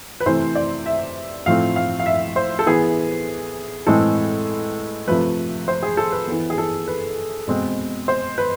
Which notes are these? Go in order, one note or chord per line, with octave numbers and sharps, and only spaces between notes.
B4
C3 E3 A3 C5
D5
E5
A2 F3 A3 C4 F5
F5
F5
E5
C5
A4
E3 B3 G#4
A2 E3 G#3 C4 A4
C3 F3 A3 B4
C5
G#4
A4
B4
E3 B3
G#4
A4
B4
B2 G#3 C4
C5
B4